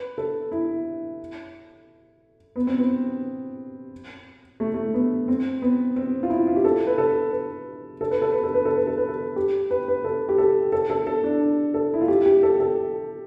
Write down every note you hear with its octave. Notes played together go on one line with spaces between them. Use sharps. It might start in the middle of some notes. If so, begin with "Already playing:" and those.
Already playing: B4
A4
E4
B3
C4
B3
A3
A3
B3
C4
B3
C4
F4
E4
F4
G4
A4
B4
A4
B4
A4
B4
A4
B4
A4
B4
A4
B4
A4
B4
A4
G4
B4
B4
A4
G4
A4
A4
A4
A4
D4
A4
E4
F4
G4
G4
A4
A4